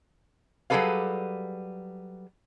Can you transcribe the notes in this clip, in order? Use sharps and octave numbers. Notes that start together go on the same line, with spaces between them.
F#3 G3 G#4 A4 B4 F5